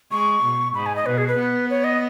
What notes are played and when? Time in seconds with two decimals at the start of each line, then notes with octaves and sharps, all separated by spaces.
0.11 G#3 C#6
0.43 B2
0.74 G#2 B5
0.86 G#5
0.96 D#5
1.06 B2 B4
1.18 G#4
1.28 B4
1.38 B3
1.70 C#5
1.84 D#5